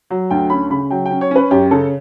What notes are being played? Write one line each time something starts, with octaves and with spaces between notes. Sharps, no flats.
F#3
D2 G5
C#4 B5
C#3 B5
F#3 G5
G5
C#4
C#5
C#4 B4
F#2 G4
C#3 A4